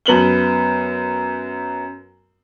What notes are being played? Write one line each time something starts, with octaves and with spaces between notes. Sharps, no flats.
F#2 B3 F#7 G7